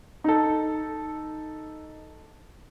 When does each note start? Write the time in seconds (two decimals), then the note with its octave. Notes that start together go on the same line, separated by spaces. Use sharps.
0.24 D#4 A4